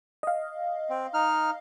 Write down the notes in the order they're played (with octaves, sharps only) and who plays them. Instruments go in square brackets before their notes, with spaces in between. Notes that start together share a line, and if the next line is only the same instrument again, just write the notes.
[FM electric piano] D#5 F5
[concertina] C4
D#4 F6